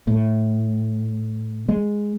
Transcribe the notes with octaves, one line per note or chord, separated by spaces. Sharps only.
A2
G#3